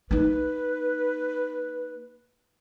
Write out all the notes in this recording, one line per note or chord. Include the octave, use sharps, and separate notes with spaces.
A#3 D#4 B4